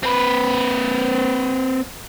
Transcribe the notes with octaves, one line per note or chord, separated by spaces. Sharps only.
C4 B4